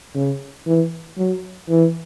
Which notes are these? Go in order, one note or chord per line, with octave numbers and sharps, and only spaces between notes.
C#3
E3
F#3
E3